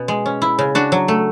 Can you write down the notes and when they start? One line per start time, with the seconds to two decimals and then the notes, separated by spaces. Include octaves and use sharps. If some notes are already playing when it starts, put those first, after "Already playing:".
Already playing: B2 C#4
0.08 G#3
0.26 C#4
0.42 E4
0.59 C#3
0.75 D4 F#4
0.92 F#3
1.08 A3